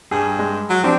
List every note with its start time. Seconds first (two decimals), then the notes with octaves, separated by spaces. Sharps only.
0.11 G2 G#4
0.39 G#3
0.70 F#3
0.84 F3 C4 D4 G4